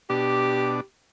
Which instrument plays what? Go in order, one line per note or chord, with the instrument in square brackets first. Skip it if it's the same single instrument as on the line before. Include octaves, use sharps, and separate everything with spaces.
[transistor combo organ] B2 D4 [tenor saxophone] G4